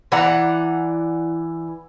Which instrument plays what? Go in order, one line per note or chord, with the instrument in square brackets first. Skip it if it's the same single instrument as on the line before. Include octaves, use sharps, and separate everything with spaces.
[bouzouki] E3 D5 F#5 A#5